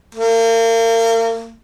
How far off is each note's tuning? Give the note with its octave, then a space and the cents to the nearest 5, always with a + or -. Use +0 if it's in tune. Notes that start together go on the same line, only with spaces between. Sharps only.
A#3 -40